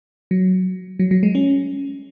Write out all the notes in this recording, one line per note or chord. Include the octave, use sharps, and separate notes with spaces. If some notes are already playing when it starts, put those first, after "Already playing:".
F#3
F#3
F#3
G#3
C#4